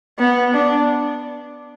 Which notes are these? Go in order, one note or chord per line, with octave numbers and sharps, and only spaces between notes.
B3
D4